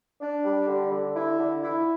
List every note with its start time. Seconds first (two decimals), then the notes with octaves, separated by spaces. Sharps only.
0.21 D4
0.45 G3
0.68 D3
0.92 D3
1.15 E4
1.39 D3
1.63 E4